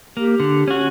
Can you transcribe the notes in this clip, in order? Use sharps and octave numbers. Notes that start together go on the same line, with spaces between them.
A#3 G4
D3
C#4 F#4